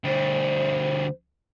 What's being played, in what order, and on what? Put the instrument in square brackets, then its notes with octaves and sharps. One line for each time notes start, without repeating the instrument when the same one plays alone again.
[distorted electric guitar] D2 G3 [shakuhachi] C5